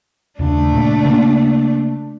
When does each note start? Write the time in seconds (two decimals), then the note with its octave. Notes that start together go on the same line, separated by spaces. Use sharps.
0.39 D#2 C#3 A3 D4
0.73 A#2 C#3
1.05 C#3 A#3